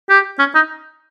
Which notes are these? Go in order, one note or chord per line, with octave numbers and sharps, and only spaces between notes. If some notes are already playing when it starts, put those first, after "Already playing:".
G4
C#4
D#4